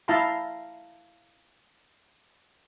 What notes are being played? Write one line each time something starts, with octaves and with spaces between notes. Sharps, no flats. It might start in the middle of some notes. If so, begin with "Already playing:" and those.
E4 E5 F5 A5 A#5 C6